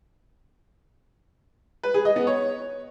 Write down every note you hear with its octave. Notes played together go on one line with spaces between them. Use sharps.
B4
G#4
D#5
B3
C#5